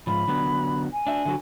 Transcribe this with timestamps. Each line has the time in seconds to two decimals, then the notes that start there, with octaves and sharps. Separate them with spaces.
0.07 G#2 F3 B5
0.28 D3 F#3 B3
0.93 G#5
1.07 D4 E5
1.25 D3 F#3 F#4